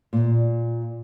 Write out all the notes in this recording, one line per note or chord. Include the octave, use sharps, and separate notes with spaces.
A#2